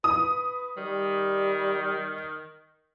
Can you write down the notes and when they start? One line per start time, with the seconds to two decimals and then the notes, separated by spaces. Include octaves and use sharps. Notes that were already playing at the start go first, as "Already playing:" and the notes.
0.04 B4 D#6
0.77 D#3 G3